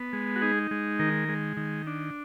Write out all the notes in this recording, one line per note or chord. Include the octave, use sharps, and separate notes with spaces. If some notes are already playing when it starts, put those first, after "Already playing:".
Already playing: B3
G#3
F#4
D#4 G#4
G#3
D#3 A#4
G#3
D#3
D4